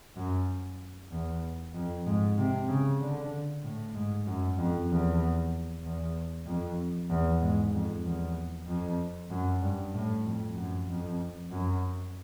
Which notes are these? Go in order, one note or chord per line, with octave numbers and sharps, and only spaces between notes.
F#2
E2
F2
G#2
C3
C#3
D3
A2
G#2
F#2
F2
E2
E2
F2
E2
G#2
F2
E2
F2
F#2
G2
A2
F2
F#2
F2
F#2